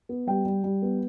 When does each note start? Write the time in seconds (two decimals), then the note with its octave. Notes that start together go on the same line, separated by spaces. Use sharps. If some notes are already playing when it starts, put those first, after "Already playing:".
0.09 B3
0.27 G3 G5
0.45 G3
0.64 G3
0.82 B3